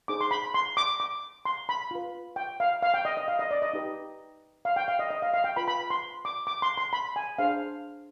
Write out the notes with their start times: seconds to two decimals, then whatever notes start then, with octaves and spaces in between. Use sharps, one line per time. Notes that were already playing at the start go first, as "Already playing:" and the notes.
0.08 D#4 G#4 C5 D6
0.21 C6
0.31 B5
0.54 C6
0.77 D6
1.00 D6
1.45 C6
1.69 B5
1.91 F4 B4
2.36 G5
2.60 F5
2.83 F5
2.94 G5
3.05 D#5
3.17 D#5
3.28 F5
3.39 D#5
3.51 D5
3.62 D#5
3.73 D#4 G4 B4
4.65 F5
4.76 G5
4.88 F5
4.99 D#5
5.11 D#5
5.22 F5
5.34 F5
5.44 G5
5.56 F4 B4 B5
5.68 B5
5.90 C6
6.25 D6
6.47 D6
6.62 C6
6.77 C6
6.93 B5
7.16 G#5
7.38 D4 G#4 C5 F5